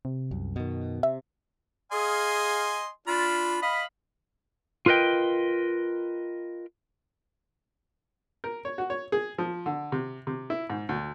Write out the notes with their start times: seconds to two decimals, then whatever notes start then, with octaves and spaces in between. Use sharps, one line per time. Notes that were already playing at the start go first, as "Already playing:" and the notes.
0.05 C3
0.31 C2 F#2
0.56 B2 D#3
1.03 C3 E5
1.92 G#4 D#5 F5 G#5 C6
3.07 D4 F4 B5
3.62 D#5 F5 B5
4.86 F4 A#4 B4 D#5 G5
8.44 A#4
8.65 C#5
8.78 F#4
8.90 C#5
9.12 G#4
9.38 F3
9.66 D3
9.92 C3
10.27 C3
10.50 E4
10.70 G#2
10.89 D2